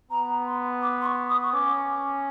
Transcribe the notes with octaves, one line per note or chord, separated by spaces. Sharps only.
B3 A#5
C6
D6
C6
C#6
D#6
C#6
C#4 D6